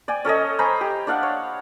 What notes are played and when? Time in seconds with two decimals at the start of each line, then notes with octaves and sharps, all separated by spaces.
0.08 D5 G5 G#5
0.25 C#4 A4 C#5 D#5
0.59 C5 G#5 A#5 B5
0.81 G4
1.07 D4 D5 F5 F#5
1.23 C#5